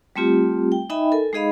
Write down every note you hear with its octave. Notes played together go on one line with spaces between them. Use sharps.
G3 A3 C4 F4 G4
G5
D#4 D#5 E5 G5 G#5 B5
A4 A#4 G#5
G#3 D#4 G#4 D#5 F5 B5